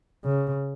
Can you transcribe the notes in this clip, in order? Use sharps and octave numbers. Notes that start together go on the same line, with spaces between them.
C#3